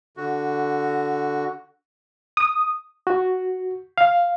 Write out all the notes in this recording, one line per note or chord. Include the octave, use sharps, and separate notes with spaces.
D3 F#4
D#6
F#4
F5